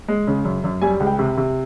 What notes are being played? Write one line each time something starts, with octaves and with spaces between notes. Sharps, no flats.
G#3
C#3
F#2
F#2
G3 G#5
C#2
G5
C3
C3